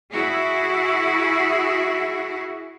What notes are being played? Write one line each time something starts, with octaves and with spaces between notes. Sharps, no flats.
E4 F#4 G#4